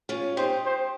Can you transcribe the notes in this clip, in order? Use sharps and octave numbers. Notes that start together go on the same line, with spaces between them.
C#4 F4
D#4 G4 C5
C5